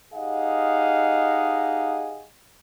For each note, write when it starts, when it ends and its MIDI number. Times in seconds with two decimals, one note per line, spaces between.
0.13 2.26 63
0.13 2.26 67
0.13 2.26 68
0.13 2.26 75
0.13 2.26 77
0.13 2.26 78